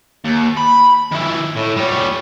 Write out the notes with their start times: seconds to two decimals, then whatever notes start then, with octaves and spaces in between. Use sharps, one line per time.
0.24 D#2
0.57 B5
1.11 D#3 E4
1.56 A2
1.77 G3 C#5